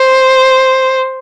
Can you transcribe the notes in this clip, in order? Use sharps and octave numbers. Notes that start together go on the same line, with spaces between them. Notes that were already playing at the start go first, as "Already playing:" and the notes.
Already playing: C5